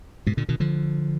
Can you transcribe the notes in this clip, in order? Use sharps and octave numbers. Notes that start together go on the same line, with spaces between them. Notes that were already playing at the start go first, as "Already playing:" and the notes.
G#2 B2
A#2 D3
B2 D#3
D3 F3